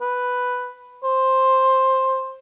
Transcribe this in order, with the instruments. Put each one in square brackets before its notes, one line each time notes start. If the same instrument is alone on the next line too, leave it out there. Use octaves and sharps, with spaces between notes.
[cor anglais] B4
C5